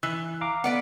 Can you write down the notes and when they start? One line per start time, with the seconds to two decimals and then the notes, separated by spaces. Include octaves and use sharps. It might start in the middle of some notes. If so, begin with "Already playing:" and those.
0.03 E3 E6 F#6
0.41 F5 A#5 D6
0.64 A3 B3 B4 D5 F#5